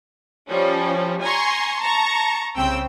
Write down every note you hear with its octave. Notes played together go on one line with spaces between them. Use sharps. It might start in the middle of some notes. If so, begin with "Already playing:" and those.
F3 G3 C#4
G#5 A#5 C6 C#6
A5 A#5 C#6
C2 C#3 C4 G5 E6